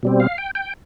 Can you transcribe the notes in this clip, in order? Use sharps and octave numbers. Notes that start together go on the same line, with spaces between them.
B2 G3 C4
F5
G5
G5